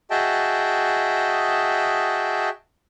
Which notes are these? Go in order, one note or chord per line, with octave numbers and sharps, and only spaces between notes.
F#4 G#4 D#5 E5 G5 A5